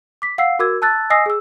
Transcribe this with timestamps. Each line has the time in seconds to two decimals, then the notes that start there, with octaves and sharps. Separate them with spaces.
0.22 D6 B6
0.38 F5 F#5 E6 C7
0.59 F#4 A#4 D6 E6 G#6
0.82 A5 E6 F#6 A6
1.10 D#5 G#5 D#6 E6 A#6 C7
1.26 G#4 E6